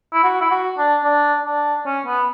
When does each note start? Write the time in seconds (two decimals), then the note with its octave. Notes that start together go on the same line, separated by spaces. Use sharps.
0.13 E4
0.23 F#4
0.41 E4
0.51 F#4
0.78 D4
1.05 D4
1.46 D4
1.86 C#4
2.06 B3